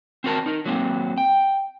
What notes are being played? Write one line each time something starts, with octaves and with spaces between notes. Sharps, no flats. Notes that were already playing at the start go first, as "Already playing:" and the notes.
C4 F#4 A#4 A5
D#4 A#4
F#3 A#3 C4
G5